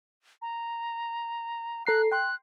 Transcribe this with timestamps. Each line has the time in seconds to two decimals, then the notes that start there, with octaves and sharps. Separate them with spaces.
0.42 A#5
1.87 A4 A#5 F#6 C7
2.12 G5 C6 F#6